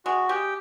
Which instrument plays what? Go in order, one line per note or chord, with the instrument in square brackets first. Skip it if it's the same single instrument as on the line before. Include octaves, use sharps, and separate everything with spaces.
[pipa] G#3 [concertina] F#4
[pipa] G#3 [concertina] G4